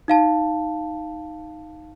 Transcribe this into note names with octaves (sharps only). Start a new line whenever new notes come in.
D#4 F5 A5